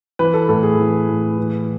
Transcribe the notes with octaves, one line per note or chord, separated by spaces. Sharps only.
E3 B4
A4
A2 A4
G#4
E3
A2
E3